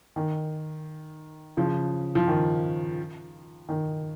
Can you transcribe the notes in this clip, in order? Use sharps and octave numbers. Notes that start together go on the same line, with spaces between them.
D#3
C#3 F3
F3
D#3
D#3